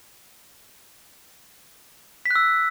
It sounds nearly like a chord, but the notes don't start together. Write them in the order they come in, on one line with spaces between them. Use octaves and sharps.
B6 F#6 E6